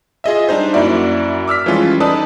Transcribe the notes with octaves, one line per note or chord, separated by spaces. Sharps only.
F4 G#4 D#5 E5
G3 D4 D#4 C5
F#2 A#3 E4 F#4 D5 E5
D6 E6 F6 B6
E3 F3 G3 G#3 C#4 F4
D#4 A4 B4 D5 A5 D#6